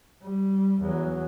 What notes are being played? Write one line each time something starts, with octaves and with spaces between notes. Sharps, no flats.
G3
E2 F#3